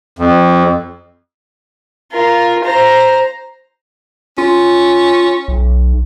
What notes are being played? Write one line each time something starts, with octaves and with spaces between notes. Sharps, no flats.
F2
F4 A#4
C5 A#5
C#4 F4
B1